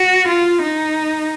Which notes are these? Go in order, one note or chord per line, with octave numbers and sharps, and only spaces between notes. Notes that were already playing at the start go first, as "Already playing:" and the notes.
Already playing: F#4
F4
D#4